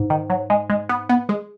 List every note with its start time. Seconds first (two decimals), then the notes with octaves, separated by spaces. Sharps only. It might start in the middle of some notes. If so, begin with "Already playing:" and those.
Already playing: G#2
0.10 D#3
0.30 F#3
0.50 G#3
0.70 G#3
0.89 B3
1.09 B3
1.29 G#3